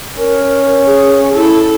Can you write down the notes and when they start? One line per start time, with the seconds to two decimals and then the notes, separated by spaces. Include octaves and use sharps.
0.18 C#4 A#4
0.87 G#4
1.34 E4 A4